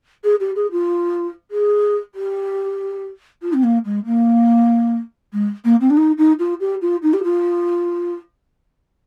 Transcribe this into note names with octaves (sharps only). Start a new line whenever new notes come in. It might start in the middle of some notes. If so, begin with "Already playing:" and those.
G#4
G4
G#4
F4
G#4
G4
F4
C4
A#3
G#3
A#3
G#3
A#3
C4
D4
D#4
D#4
F4
G4
F4
D#4
G4
F4